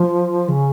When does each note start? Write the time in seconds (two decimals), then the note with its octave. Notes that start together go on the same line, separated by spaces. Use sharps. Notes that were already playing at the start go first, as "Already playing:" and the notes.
Already playing: F3
0.48 C#3